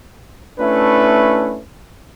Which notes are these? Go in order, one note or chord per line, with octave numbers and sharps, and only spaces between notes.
A3 C#4 D4 E4 B4